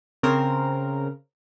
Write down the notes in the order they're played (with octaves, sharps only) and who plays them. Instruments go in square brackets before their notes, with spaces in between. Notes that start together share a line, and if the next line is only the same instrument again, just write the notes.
[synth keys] C#3 C4 A#4